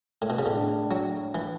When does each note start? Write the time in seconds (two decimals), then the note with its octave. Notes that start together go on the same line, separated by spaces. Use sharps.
0.22 A2
0.30 B2
0.39 C#3
0.46 A2 D3 G#3 D4
0.91 F#3
1.35 E3